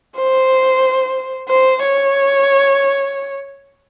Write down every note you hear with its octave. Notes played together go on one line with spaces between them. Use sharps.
C5
C5
C#5